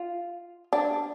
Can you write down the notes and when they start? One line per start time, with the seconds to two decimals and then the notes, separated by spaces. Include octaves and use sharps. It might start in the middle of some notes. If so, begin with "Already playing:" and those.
Already playing: F4
0.73 D4